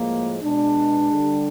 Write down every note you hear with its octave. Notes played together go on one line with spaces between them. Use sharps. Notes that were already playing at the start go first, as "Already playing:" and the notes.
Already playing: A2 F3 G#3 A#3
B2 G#3 D4
D3 G3